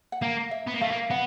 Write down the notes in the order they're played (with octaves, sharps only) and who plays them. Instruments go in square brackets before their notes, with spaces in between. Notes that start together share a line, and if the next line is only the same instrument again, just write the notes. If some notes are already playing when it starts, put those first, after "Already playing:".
[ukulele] F#5
[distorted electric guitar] A#3 [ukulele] F5
[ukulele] E5
[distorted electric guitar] B3
A#3
[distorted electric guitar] A3 [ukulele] F5
[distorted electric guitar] A#3
[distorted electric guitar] B3 [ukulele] F#5